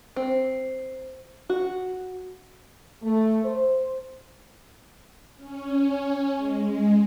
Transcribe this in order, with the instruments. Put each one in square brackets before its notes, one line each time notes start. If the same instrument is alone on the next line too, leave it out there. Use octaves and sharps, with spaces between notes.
[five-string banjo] C4
F#4
[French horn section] A3
C5
[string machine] C#4
G#3